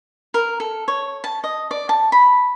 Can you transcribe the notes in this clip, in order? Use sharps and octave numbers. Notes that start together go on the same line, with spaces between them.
A#4
A4
C#5
A5
D#5
D5
A5
B5